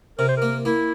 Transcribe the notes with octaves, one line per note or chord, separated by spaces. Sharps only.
C3 A#4
C5
A#3 A#4
A#3 E4